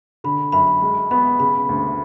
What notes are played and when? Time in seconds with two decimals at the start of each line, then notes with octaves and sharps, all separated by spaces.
0.24 D3 B5
0.52 F#2 B5
0.82 G#3
1.11 B3 B5
1.39 C#3 B5
1.69 D2